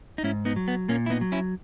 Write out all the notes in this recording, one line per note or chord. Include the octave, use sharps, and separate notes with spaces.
D#4
G#2 C#4 E4
B3 D#4
F#3
B3
A#2 A#3 C#4
E4
B3 D#4
F#3
C#4 E4